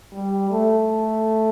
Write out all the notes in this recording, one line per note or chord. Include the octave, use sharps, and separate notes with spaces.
G3
A3